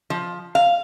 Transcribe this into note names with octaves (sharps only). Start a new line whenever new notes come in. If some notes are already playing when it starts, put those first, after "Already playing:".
F3
F5